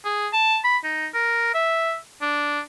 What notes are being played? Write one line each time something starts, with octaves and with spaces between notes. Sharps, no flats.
G#4
A5
B5
D#4
A#4
E5
D4